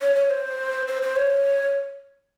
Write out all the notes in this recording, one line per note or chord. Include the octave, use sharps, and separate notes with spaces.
C#5
C#5
C5
C5
C5
C#5